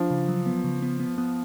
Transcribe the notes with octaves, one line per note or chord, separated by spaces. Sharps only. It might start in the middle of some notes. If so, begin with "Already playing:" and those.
Already playing: F3 D4
C#3
F#3
B3
C#3
B3
B3
B3